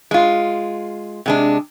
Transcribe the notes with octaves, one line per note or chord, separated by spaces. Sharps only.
G#3 F4
C3 G#3 D4